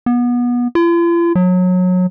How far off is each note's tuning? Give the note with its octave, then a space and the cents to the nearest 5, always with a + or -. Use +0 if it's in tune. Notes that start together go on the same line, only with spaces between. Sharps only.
B3 -25
F4 -45
F#3 -25